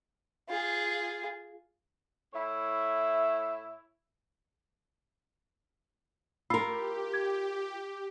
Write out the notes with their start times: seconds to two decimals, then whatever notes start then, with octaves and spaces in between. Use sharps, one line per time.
0.49 F4 G#4
2.34 A2 E4 C#5 E5
6.50 F4 G4 A#4 B5 E6 C7
7.14 G#6